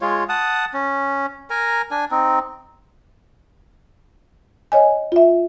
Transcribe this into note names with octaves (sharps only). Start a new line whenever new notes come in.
G#3 F4 C#5
F#5 A5 D#6
C#4
A#4 G#5 A#5
D4 G#5
C4 D#4
C#5 D#5 G#5
F4 E5